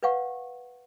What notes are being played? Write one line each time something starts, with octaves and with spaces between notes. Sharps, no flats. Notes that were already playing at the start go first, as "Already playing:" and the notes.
B4 C#5 F5 F#5 C#6